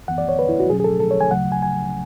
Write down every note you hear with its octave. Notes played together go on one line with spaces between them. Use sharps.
F#2 E3 B3 F#5
D5
C#5
B4
E4
F#4
B2 F#3 C#4 G#4
G#4
A4
A4
C#5
G#5
D2 C#3 F#3 A3 F#5
G#5
G#5